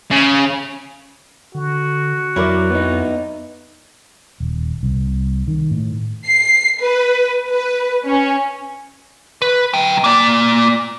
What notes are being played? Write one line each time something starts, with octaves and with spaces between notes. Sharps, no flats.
C#3
D3 F#4
F2 F#3 E4 A#4 D5
B3 D#4
D#1
C2
D#3
A2
C7
B4
B4
C#4
B4
F#3 G5
A#3 D5